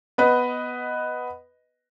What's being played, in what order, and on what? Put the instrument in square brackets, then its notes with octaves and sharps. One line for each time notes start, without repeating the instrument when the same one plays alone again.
[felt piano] B3 B4 D#5